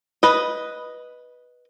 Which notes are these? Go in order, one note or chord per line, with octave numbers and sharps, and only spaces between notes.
B4 D#5